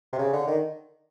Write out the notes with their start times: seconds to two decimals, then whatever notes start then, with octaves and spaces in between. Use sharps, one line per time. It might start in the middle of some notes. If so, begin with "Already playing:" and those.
0.13 C3
0.18 C#3
0.33 D3
0.47 D#3